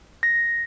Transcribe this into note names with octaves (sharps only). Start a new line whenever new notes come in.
A#6